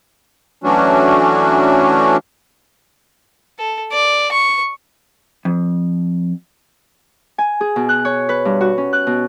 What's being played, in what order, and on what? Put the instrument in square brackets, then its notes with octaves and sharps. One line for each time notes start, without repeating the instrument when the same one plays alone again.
[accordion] E3 F#3 A3 C#4 D4 F#4
[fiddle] A4
D5
C#6
[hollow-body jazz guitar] F2
[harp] G#5
G#4
B2
F#6
C#5
B4
G2
F#4
C#4
F#6
B2